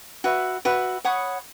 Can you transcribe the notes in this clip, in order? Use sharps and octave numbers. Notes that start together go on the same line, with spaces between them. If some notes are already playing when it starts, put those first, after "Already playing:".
F#4 B4 E5
F#4 B4 E5
C#5 F#5 B5 D#6